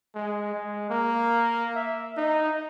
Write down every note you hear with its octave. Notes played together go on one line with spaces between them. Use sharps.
G#3
G#3
A#3
E5
D#4